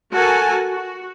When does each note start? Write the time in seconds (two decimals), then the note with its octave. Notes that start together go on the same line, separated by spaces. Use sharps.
0.13 F#4 A4 A#4 G#5 A5
0.68 F#4